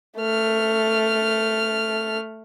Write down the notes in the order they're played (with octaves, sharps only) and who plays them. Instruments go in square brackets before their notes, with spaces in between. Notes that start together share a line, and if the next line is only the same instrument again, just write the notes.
[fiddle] A3 F6